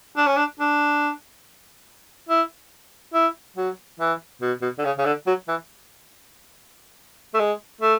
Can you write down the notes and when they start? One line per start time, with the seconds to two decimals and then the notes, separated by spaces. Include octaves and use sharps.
0.17 D4
0.27 C#4
0.37 D4
0.60 D4
2.29 E4
3.14 E4
3.57 F#3
4.00 E3
4.42 B2
4.62 B2
4.79 D3
4.85 C#3
4.99 C#3
5.06 D3
5.27 F#3
5.48 E3
7.34 A3
7.40 G#3
7.81 A3